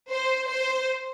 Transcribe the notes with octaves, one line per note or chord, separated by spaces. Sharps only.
C5
C5